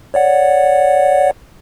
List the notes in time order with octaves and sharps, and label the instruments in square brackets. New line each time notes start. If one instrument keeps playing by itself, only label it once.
[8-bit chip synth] C#5 D5 F#5